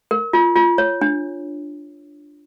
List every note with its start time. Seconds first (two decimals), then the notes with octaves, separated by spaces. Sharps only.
0.11 A#4
0.33 F4
0.56 F4
0.78 C#5
1.01 D4